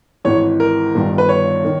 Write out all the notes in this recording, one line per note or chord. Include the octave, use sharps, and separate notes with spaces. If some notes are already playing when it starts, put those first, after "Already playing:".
G#1 G#2 E3 C#5
A#4
G1 G2 D#3
B4
C#5
D#3